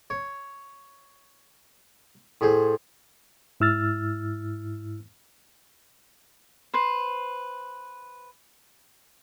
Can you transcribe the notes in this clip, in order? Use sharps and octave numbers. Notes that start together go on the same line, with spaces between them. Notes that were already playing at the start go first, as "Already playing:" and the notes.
C#5
A2 G#4 C5
G#2 E4 E6 F6 A6
B4 C5